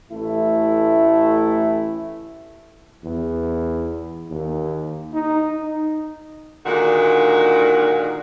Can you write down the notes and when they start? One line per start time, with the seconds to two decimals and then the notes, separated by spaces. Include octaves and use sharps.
0.11 A1 A3 E4
3.04 E2
4.30 D#2
5.13 D#4
6.66 A#2 D3 D#3 G#3 F#4